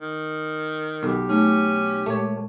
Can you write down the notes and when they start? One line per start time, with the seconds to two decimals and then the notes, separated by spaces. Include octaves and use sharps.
0.01 D#3
1.03 B1 G4 A4
1.29 A3 C#4 D#4
2.06 A#2 G#3 A3 C#5